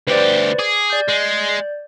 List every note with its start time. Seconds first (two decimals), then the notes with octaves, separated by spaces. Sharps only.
0.07 D2 G4 B4 C5 D5
0.59 G#4 D6
0.90 D5 G6
1.08 G#3